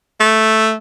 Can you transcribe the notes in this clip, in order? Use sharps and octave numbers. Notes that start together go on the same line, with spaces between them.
A3